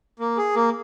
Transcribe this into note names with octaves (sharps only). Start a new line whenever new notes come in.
A#3
G#4
A#3